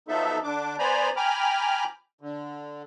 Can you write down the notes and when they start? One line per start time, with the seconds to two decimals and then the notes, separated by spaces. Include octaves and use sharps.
0.08 F3 F#3 B3 D#4 A4 E5
0.44 D3 D4 D6
0.79 B3 C5 D5 G#5 A#5 B5
1.16 G5 G#5 A#5 B5 D6 F6
2.21 D3